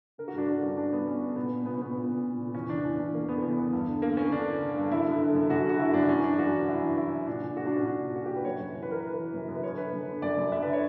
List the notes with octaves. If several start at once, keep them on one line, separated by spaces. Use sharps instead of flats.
D3 A#4
F#4
G2 D4
D3 D4
G2 C#4
G2 D4
G2 B3
G2 C#4
D3
A#2 B3
A#2
A#2 B3
C#4
A#2 B3
A#2
A#2
A#2
A#2
E2 C#4
E2 D4
E2 D4
E2
E2 A#3
D3 B3
E2 B3
E2
G2
D3
D3 A#3
D3 C#4
D3 D4
D3
D3
G2
F#2 E4
D3
D3
F#2
F#2 F#4
D3 F#4
D3 E4
F#2 D4
E3 C#4
E3 D4
G2 F#4
E3
G2 E4
E3
E3 E4
E3
A#2 D4
A#2
A#2 F#4
D4
A#2
C#4
A#2 D4
A#2
A#2 F#4
G4
A#2
B4
F#2 C#5
F#2
E3 C#5
B4
E3 A#4
E3 B4
E3
F#2
F#2
B4
D3 C#5
D3 B4
F#2
D3
F#2 D5
F#2
D3 E5
B4
D3
C#5